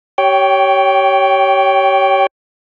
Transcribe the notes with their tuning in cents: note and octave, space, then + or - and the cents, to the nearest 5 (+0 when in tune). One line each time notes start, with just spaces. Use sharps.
G4 -25 C#5 +10 G5 +0